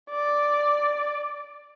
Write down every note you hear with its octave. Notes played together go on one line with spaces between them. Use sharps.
D5